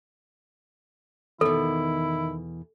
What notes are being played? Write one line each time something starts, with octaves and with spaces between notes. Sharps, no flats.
E2 B2 D#3 E4 A4